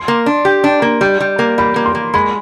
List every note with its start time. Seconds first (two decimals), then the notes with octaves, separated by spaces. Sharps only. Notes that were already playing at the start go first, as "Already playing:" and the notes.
Already playing: C6
0.08 A#3
0.26 D4
0.45 G4
0.64 D4
0.82 A#3
1.01 G3
1.20 G3
1.39 A#3
1.58 G3 B5
1.76 A#3
1.86 C6
1.95 A#3
2.14 G#3 B5